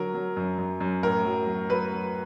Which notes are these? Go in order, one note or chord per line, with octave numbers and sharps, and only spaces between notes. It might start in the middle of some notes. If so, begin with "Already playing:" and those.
Already playing: D3 F#3 A#4
F#3
F#2
F#2
F#2
A2 A#4
F#3
F#3
F#3 B4
F#3